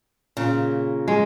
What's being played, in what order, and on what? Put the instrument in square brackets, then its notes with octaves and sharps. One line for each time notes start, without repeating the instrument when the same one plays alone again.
[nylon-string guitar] A#2 [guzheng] C#3
[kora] G#3